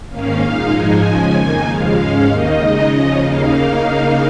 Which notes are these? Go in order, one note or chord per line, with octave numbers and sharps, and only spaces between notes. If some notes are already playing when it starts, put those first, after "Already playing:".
G#2 D#3 A#3 C#4 F5
A#2 G#3 D#4
G#2 F3 G#3 D#4 G#5
C#3 F3 G#3 C#4
F2 D#3 A#3 D#4
D#2 C#3 F3 G#3 F5
G#2 G#3 C#4
D#2 D#3 A#3 D#4 D#5
C#3 G#3 D#4
C#3 F3 C#4
D#2 C#3 A#3 D#4 F5
C#3 A#3 D#4